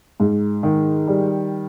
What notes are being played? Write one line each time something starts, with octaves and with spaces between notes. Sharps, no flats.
G#2
D#3
G3